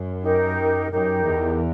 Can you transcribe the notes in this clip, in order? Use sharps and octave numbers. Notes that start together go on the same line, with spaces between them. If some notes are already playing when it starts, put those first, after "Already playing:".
Already playing: F#2
D#4 G4 A#4
F#2 D#4 G4 A#4
E2